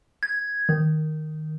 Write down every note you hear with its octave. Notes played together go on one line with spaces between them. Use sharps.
G#6
D#3